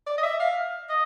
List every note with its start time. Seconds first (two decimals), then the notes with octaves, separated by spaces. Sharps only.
0.07 D5
0.18 D#5
0.23 E5
0.40 F5
0.90 D#5